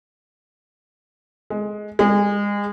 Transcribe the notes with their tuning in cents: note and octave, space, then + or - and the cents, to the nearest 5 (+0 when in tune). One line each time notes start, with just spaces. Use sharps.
G#3 +10
G#3 -30